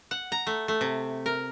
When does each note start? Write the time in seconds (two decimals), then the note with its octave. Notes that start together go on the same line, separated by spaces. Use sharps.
0.11 F#5
0.32 A#5
0.47 A3
0.68 A3
0.81 C3
1.26 A#4